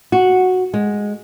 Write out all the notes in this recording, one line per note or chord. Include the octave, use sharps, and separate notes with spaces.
F#4
G#3